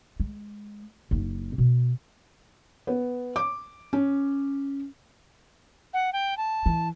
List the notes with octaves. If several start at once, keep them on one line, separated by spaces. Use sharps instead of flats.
G#3
F#1 D#4
B2
B3
D6
C#4
F#5
G5
A5
E3